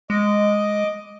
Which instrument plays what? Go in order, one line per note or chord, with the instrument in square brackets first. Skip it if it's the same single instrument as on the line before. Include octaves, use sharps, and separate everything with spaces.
[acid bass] G#3 [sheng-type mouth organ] D#5 D6